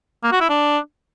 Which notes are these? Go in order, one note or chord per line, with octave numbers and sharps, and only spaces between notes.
A#3
F#4
E4
D4